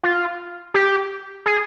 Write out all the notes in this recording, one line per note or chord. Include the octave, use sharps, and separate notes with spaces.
F4
G4
G#4